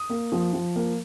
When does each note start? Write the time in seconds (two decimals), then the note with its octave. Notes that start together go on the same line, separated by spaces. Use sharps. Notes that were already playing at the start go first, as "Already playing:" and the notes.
Already playing: D#6
0.10 A#3
0.32 F3
0.53 F3
0.76 A#3